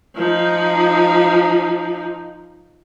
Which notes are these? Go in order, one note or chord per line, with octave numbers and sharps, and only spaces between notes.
F3 D#4